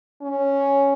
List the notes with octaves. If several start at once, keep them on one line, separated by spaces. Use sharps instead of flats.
C#4